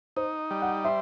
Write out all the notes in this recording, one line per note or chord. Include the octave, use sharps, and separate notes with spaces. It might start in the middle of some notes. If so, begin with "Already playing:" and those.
D#4 C5
G3
F#5
C5 E5